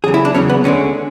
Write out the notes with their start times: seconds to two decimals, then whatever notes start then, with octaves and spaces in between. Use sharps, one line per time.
0.04 E2 C#3 F#3 G#4
0.14 E4
0.25 D4
0.35 E2 C#3 F#3 C#4
0.50 B3
0.64 D2 D3 G#3 C#4